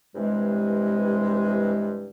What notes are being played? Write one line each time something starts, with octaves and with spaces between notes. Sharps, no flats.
G2 C3 E3 G#3